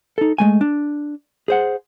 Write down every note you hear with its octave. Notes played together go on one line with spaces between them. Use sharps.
D#4 A4
G#3 A3 G#5
D4
G#4 C5 F#5